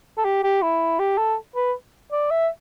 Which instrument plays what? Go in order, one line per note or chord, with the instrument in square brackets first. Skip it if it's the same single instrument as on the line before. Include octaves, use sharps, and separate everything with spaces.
[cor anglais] A4
G4
G4
E4
G4
A4
B4
D5
E5